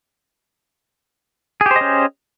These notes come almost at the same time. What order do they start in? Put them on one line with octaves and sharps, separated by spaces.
G#4 G4 C5 D#5 C#4